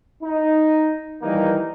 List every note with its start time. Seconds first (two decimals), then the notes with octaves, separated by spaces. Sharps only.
0.23 D#4
1.22 D#3 E3 G3 A#3 D#4